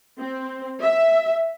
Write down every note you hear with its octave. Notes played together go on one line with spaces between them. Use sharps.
C4
E5